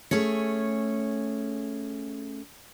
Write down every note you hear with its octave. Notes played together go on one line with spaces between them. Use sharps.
A3 C#4 G#4 C#5